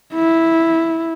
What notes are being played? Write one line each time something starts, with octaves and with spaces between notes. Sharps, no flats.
E4